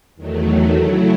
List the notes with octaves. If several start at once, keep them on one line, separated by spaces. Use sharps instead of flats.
E2 D#3 F#3 A3
C#3 F#3 A3 E4